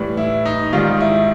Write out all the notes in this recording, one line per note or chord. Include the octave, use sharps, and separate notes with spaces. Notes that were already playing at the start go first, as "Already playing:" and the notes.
Already playing: A2 E3 G3
E4
D#4
G#2 D#3 G3 F4
E4